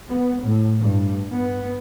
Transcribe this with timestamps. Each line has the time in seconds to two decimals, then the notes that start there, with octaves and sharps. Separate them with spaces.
0.10 B3
0.44 A2
0.81 G2
1.34 B3